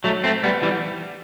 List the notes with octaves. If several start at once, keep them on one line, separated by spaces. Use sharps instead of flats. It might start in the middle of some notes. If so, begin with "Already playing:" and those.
F#3 A3
A3 C4
G3 B3
E3 G3